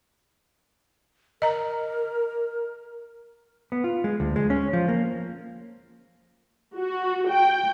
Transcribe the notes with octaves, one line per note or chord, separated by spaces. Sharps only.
A#4 D#5 A#5
B3
F4
G#3
D2
G#3
C#4
F3
A#3
F#4
G5